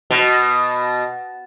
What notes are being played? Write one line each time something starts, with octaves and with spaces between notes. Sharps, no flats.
B2